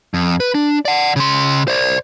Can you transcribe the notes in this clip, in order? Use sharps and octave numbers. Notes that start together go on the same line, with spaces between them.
F2
B4
D4
D5 F#5
C#3 C6
C5 D5